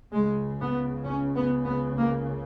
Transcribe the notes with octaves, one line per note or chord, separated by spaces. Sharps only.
C#2 C#3 G#3
B3
C#4
B3
B3
A#3